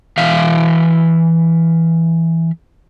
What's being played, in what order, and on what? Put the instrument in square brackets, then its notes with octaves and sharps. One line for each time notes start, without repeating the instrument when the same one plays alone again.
[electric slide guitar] E3 E5 F5